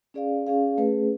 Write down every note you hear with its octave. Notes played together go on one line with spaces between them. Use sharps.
C#4 G#4 D5 F5
C#4 G#4 D5 F5
A3 C#4 G#4 B4